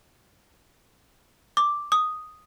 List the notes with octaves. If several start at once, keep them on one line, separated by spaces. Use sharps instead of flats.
D6
D#6